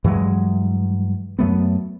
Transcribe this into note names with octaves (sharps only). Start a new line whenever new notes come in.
G2 E3 F#3 G#3
F#2 F#3 A3 B3